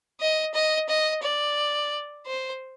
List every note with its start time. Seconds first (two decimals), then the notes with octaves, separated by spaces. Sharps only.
0.20 D#5
0.54 D#5
0.89 D#5
1.23 D5
2.26 C5